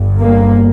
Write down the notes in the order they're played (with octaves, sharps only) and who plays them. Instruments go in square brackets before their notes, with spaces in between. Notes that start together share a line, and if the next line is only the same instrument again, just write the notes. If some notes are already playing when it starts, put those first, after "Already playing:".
Already playing: [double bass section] G1 G2
A#3